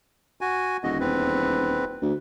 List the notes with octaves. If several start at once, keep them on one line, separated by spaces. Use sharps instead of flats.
F#4 G#5
D#1 D3 F#4 D#5
E2 C4 B4
D2